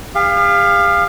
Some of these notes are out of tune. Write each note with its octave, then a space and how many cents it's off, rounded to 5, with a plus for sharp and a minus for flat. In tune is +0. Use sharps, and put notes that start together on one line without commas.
G4 +45 F5 +0